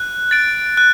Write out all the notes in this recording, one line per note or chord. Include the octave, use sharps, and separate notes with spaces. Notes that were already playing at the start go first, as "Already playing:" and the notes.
Already playing: F#6
A6 D7
F#6